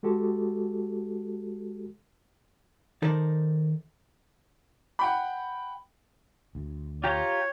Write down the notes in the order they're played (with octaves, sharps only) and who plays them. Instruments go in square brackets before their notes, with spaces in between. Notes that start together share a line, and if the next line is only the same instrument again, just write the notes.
[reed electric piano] G#3 F#4 G4 A4
[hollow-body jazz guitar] D#3 D#4 A4 A#4 C5 D5
[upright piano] F#5 G5 B5
[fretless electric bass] D2
[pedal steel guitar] F4 G4 A#5 [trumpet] C#5 [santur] G5